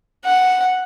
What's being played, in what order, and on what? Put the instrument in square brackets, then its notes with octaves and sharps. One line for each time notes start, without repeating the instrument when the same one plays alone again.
[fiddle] F#5